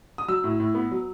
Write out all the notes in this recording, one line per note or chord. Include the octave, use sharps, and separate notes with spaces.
D#6
F#3 E6
A2
A2
B3
F#3